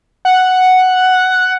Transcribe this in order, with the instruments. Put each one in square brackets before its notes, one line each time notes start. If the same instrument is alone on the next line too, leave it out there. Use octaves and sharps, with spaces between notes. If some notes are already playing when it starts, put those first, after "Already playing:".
[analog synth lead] F#5